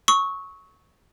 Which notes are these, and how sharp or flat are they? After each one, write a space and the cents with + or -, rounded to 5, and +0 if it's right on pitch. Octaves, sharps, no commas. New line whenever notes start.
C#6 +0 E6 -40